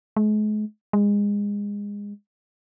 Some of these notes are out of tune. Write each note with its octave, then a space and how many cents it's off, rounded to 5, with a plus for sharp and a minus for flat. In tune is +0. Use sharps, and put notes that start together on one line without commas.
G#3 +40
G#3 -25